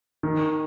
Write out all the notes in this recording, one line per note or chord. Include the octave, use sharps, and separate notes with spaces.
D#3